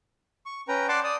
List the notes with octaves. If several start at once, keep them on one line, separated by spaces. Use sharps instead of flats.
C#6
C#4 B4 G5 A#5
D5 F#5 A5 C6 D6
D5 D#6